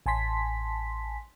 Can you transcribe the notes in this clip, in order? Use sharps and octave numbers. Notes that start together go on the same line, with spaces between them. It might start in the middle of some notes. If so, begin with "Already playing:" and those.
A1 G#5 A5 C6 B6